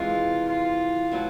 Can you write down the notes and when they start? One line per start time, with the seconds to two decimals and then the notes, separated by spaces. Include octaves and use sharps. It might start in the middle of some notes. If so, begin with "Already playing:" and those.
Already playing: C3 E3 G#3 F4
0.48 F4
1.12 B2 F#3 B3 E4